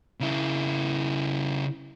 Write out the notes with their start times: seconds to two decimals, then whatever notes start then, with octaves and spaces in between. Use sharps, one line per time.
0.20 C#3 E4